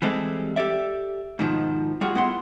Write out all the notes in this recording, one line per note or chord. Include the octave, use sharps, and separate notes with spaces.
E3 G3 G#3 C4 G4 A4
G4 A4 D5 E5
G#2 B2 D#3 F3
G3 F4 F#4 G#4
B3 E4 F#5 C6